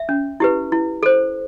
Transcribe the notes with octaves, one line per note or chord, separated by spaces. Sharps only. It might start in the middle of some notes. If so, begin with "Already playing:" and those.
Already playing: E5
C#4
E4 G4 B4
E4
A4 C5